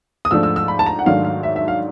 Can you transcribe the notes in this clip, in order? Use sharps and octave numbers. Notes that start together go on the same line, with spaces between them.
D#6
G#2 F3 A3 D4 E6
E6
E6
B5
A5
A#5
F#5
G#2 D#3 F#3 A3 D4 F5
F5
E5
E5
F5